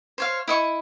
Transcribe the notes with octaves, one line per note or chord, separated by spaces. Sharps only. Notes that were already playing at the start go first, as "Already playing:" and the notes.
C5 C#5 F5
E4 D#5 C#6